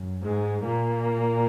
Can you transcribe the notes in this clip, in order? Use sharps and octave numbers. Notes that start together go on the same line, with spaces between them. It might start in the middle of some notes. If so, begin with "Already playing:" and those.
Already playing: F#2
G#2 G#3
A#2 A#3